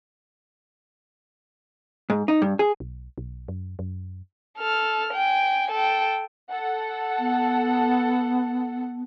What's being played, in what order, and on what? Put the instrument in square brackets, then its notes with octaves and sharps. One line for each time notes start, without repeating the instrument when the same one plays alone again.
[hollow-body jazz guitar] G#2
D#4
G2
G#4
[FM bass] B1
B1
F#2
F#2
[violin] A4 F6
G5 G#5
A4 G5
[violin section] A4 F#5
[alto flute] B3